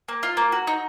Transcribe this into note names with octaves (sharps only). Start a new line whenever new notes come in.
A#3
F4
A#3
F#4
D#4